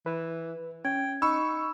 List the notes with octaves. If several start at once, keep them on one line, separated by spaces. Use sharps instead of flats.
E3 B4
C#4 G5 G#6
D#4 B5 C#6 E6